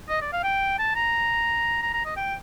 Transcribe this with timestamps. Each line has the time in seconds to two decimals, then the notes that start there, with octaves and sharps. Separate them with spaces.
0.09 D#5
0.21 D5
0.33 F5
0.44 G5
0.79 A5
0.95 A#5
1.82 A#5
1.93 A#5
2.05 D#5
2.16 G5